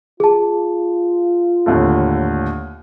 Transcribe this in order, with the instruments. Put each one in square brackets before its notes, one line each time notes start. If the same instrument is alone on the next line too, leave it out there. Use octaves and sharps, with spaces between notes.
[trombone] F4 [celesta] G#4 A5
[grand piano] D#2 A2 D3